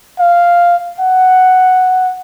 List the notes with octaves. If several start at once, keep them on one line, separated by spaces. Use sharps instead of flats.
F5
F#5